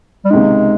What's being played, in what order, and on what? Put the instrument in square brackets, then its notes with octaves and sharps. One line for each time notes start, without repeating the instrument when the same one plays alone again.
[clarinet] G3
[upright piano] C#2 C3 D#3 [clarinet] G#3